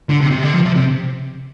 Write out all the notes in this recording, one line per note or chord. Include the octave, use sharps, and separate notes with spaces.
D3
C3
C3
D3
F3
C3
C3